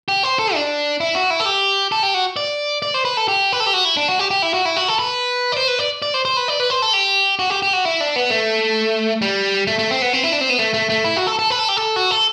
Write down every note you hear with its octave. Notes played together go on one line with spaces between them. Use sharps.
G4
C5
A4
D4
E4
F#4
E4
A4
G4
A4
G4
F#4
D5
D5
C5
B4
A4
G4
B4
A4
G4
F#4
E4
D4
F#4
G4
G4
E4
F#4
E4
F#4
A4
B4
D5
C5
B4
D5
D5
C5
C5
B4
D5
B4
C5
A4
G4
F#4
G4
G4
F#4
E4
D4
B3
A3
G3
A3
A3
C4
B3
C4
E4
D4
C4
B3
A3
A3
A3
E4
F#4
A4
A4
B4
A4
G4
A4
F#4
A4